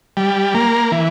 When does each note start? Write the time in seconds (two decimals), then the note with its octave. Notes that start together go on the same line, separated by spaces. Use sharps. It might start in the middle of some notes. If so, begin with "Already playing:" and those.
0.17 G3
0.54 A#3
0.92 E3